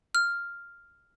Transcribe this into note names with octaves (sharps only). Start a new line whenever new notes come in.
F6